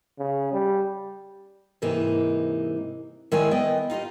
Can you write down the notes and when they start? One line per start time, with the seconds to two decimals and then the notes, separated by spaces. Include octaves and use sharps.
0.19 C#3
0.52 G3
1.82 G#2 C3 E3 A#3 D#4
3.32 D#3 G#3 E4 C#5 E5 G#5
3.51 B3 D#5 G5
3.90 D#4 F4 G4 D#5